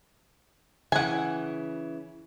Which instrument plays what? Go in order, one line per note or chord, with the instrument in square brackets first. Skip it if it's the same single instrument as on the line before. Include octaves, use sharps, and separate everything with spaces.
[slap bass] C#3 E3 [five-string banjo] F#5 G#5